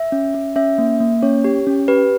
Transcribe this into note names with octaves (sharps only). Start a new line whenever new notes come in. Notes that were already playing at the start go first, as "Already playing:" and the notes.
Already playing: E5
C#4
C#4
C#4 E5
A#3
A#3
C#4 C#5
G4
C#4
G4 B4